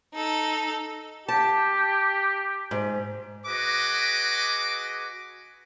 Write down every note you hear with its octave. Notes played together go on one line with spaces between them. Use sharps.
D#4 A4
G4 A5
G#2
F#4 G#4 B4 D#5 D6